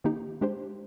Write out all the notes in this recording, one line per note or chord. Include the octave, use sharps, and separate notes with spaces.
D#3 A#3 D#4 G4
G#3 D4 G4 C5